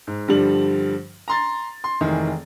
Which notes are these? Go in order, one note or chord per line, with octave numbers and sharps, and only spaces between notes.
G#2
G2 D3 F3 G3 F#7
A#5 C6 A6
C6
F1 D#3 E3 G#3 G#4